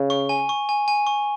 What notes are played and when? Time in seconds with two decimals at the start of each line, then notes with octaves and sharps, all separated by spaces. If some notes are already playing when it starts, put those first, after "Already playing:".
Already playing: C#3
0.10 C#6
0.29 G#5
0.49 C#6
0.69 G#5
0.88 G#5
1.07 C#6